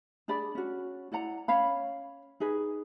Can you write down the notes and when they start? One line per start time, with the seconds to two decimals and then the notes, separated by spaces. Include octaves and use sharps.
0.28 D4 G#4 D5 B5
0.55 C#4 F#4
1.12 E4 D5 F#5 A#5
1.48 C#4 C#5 F5 B5
2.40 D#4 G#4 B4